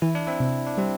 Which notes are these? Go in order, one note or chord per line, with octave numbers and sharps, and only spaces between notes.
E3 E4
D4
C4 E4
C3
D4
G3 C4